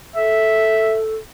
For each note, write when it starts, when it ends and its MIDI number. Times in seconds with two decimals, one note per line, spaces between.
0.16 1.15 69
0.16 0.99 76